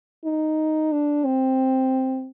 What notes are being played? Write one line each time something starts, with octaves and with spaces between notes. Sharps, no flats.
D#4
D4
C4